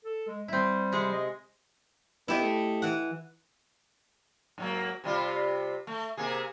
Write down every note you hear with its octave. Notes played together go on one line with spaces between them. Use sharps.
A4
G#3
G3 C4 E4
C3 G#3 G#4
D#5
B3 E4 G4 D#5
A3
E3 F#5
G#2 F#3 A#3
C3 G3 F4
A3
C3 A#3 G#4